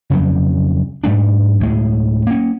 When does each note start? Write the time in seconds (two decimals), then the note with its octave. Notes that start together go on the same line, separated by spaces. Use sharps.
0.10 F2 C#3 F#3 G3
1.04 G#2 G3 A3 D4
1.60 D2 A2 G#3
2.27 A#3 C#4